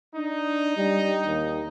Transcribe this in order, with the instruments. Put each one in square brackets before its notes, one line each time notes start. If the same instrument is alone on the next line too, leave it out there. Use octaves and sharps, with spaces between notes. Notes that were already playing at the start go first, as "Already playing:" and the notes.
[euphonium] D4 [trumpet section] D#4
[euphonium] G3
D#2